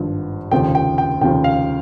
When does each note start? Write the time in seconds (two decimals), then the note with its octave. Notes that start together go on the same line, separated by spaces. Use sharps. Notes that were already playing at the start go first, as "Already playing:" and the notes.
Already playing: G#1 G2 F3
0.51 F1 D#2 C#3 F3 G5
0.75 G5
0.98 G5
1.21 F1 D#2 C#3 F3 G5
1.44 F5